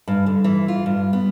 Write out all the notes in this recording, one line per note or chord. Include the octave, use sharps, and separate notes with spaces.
G2
D3
E3
F4
G2
B3